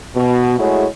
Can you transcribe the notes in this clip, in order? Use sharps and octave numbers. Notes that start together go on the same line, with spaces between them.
B2
G#3 A3 E4 F#4 G#4 C#5